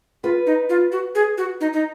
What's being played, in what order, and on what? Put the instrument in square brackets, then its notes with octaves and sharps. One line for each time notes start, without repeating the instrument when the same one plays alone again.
[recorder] F4 [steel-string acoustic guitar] B4
[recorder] D#4
F4
F#4
G#4
F#4
D#4
D#4